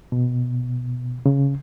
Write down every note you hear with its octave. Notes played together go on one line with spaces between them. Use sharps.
B2
C#3